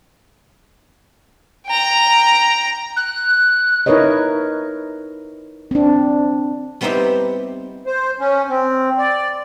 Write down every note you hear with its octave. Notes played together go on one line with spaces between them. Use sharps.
G5 A#5
F#6
D#4 E4 A#4 B4 C#5 D#5
C4 D4
G3 B3 C4 D#4 E4 G4
C5
C#4
C4
D5